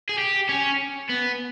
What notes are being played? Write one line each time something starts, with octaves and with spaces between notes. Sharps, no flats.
G#4
G4
C#4
B3